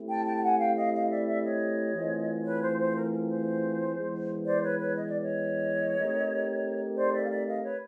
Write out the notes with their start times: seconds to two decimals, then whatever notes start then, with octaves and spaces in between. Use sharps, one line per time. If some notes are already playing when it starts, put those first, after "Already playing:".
Already playing: A3 C4 E4 G4
0.10 G5 A5
0.26 G5 A5
0.36 G5
0.43 F#5 G#5
0.60 F5 G5
0.77 D#5 F5
0.93 D#5 F5
1.10 D5 E5
1.27 D5 E5
1.43 C#5 D#5
1.94 E3 A3 C4 F4 G#4
2.45 B4 C#5
2.61 C5
2.78 C5
2.95 A#4
3.11 A#4
3.28 C5
3.96 E3 G#3 B3
4.46 C5 D5
4.62 B4 C#5
4.79 B4 C#5
4.96 D#5
5.08 D5
5.20 C#5 D#5
5.97 A3 C4 D#4 G4 A#4
6.97 C5 D5
7.14 D5 E5
7.25 F5
7.30 D5 E5
7.47 D#5 F5
7.64 B4 C#5